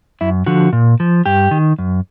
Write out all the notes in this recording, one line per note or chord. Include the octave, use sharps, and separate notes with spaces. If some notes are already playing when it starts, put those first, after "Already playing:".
F#2 E4
D3 F3 F#4
A#2
F3
G2 G4
D#3
F#2